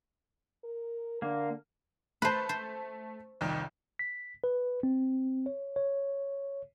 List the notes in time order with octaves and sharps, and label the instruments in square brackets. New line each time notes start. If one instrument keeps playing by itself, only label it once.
[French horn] A#4
[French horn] D3 [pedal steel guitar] A#3
[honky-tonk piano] A3 A5 [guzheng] B4 C5
[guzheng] C5
[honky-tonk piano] C2 F2 D#3
[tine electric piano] B6
B4
C4
C#5
C#5